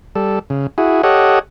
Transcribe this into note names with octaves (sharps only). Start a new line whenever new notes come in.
G3 A4
C#3
E4 F#4 G#4
G4 A4 C#5 D#5 F#5